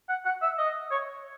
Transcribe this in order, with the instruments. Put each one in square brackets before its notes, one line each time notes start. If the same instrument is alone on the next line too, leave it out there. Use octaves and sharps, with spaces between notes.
[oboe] F#5
F#5
E5
D#5
C#5